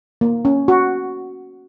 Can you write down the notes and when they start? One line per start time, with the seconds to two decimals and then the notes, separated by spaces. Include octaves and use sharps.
0.21 A#3
0.45 C#4
0.68 F#4